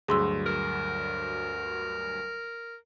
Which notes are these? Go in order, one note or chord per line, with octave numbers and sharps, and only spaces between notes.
D2 G2 F#3 G#4 C6 E6
A#4